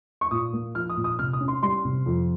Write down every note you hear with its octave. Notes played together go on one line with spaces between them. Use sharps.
C#6
A#2 D#6
A#3
F3 F6
D#6
A#2
D#6
C3 F6
D#6
C#4
C6
G3 C6
C3
F2